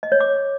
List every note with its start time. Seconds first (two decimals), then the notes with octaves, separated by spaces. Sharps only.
0.03 D#5
0.12 C#5
0.20 D6